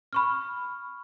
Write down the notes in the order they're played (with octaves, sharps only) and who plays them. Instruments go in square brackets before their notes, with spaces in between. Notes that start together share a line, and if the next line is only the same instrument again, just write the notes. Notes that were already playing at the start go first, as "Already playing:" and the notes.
[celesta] B5 C#6 F6